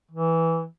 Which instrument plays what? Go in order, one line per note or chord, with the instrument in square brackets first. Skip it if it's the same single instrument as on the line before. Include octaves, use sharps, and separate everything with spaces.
[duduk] E3